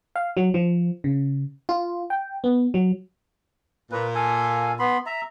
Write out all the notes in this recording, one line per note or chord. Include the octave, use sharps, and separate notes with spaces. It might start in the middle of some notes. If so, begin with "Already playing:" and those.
F5
F#3
F3
C#3
F4
G5
B3
F#3
A#2 B4
A4 F5 G#5
B3 B5 C6
E5 A#5